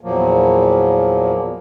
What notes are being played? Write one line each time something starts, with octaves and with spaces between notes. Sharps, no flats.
E2 A#2 F3 F#3 A#3